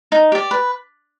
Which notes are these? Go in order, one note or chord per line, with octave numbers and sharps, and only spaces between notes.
D#4
G4 D5
B4